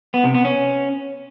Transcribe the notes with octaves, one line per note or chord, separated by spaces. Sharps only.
B3
C3
B3
C#4